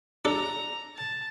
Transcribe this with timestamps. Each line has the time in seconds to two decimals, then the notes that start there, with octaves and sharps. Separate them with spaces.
0.25 D4 A4 A#5
0.96 A5